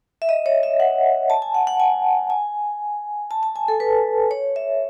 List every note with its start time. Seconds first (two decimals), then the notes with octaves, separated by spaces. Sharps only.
0.22 E5
0.29 D#5
0.46 C#5
0.63 E5
0.80 F#5
1.30 A5
1.42 G#5
1.55 F#5
1.67 F#5
1.80 G#5
2.30 G#5
3.31 A5
3.43 A5
3.56 G#5
3.68 A4
3.80 B4
4.31 C#5
4.56 E5